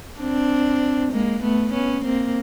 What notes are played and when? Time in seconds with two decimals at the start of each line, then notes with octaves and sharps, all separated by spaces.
0.20 C4 D4
1.12 G#3 A#3
1.43 A3 B3
1.73 B3 C#4
2.04 A#3 C4